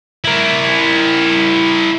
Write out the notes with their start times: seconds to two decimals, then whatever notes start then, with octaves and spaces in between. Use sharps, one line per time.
0.24 E4 A#4